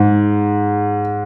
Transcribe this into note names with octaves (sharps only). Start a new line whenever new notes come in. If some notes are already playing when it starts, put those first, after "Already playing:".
Already playing: G#2